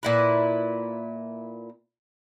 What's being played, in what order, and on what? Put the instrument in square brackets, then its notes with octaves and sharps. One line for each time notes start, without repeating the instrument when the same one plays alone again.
[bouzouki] A#2 E4 B4